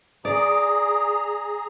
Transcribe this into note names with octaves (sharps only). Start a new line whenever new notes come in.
G#4 D5 A#5 D#6